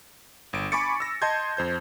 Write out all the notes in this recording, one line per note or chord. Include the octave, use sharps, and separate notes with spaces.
G1 D7
G#5 B5 C#6 D6 A6 C#7
E6 A#6
D#5 A5 C6 G6 G#6
F2 C5 G6